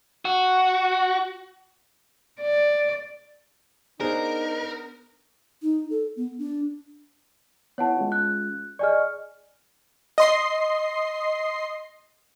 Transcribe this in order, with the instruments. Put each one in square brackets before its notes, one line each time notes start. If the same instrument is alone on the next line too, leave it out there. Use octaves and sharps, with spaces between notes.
[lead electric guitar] F#4
[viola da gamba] D5
[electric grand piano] B3 D4 C5 [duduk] D#4 [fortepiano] G#4 [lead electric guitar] A#4
[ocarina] D#4
A4
B3
D4
[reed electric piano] B3 E4 [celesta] C#5 F#5 A5
[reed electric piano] G#3 C#4 F4
[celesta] F#6
[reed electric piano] G#4 G#5 C#6 [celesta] D5 D#5 F6
[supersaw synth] D#5 C6 C7